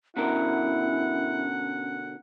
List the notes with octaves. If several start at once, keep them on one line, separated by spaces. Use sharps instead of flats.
B2 D3 C#4 E4 A#4 F#5